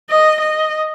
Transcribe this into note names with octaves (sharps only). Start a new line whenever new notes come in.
D#5
D#5